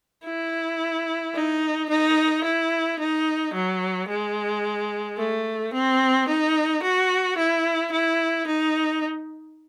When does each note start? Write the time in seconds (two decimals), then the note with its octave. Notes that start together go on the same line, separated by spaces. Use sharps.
0.25 E4
1.35 D#4
1.89 D#4
2.44 E4
2.99 D#4
3.54 F#3
4.08 G#3
5.18 A3
5.73 C4
6.28 D#4
6.83 F#4
7.38 E4
7.92 E4
8.47 D#4